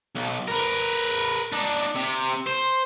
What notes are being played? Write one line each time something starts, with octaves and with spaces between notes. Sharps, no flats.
B1
A#4 B4
D4 D#4
C3
C5